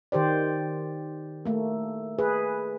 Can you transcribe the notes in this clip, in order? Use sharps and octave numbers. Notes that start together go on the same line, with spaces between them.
D#3 G4 C5 D5
A3 A#3
G#4 B4